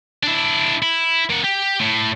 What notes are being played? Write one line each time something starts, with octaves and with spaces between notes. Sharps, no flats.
D4 E4
E4
A#3 F#5
G4
A2